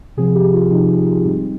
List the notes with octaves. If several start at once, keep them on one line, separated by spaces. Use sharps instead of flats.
C3 F3 C4 G#4
G4
F4
C3 F3 C4 D#4
G#2 G3 C4 D#4